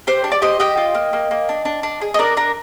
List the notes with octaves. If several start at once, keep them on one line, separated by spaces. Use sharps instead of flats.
G4 C5
D4
D5
G4 C5 D#5
G4 D#5 G5
F4
A#3
A#3
A#3
D4
D4
D4
G#4
D#5
D4 A#4 D5
D4 A#4